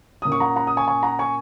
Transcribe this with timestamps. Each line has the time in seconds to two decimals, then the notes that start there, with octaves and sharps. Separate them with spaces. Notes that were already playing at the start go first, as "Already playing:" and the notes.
0.22 A#2 A#3 C#4 D#6
0.32 C#6
0.40 F#5 A#5
0.56 F#5 A#5
0.67 D#6
0.77 G#5 C#6
0.88 G#5 C#6
1.03 F#5 A#5
1.19 G#5 C#6